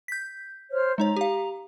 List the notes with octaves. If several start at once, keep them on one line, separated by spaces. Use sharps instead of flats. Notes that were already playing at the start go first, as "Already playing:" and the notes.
G6 B6
C5 C#5 F6
G#3 D#4 C#5 A#5
G4 F5